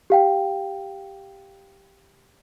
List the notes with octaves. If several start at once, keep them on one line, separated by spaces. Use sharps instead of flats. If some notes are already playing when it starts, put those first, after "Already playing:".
G4 F5 G5